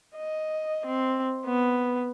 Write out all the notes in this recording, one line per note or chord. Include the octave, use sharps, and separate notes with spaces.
D#5
C4
B3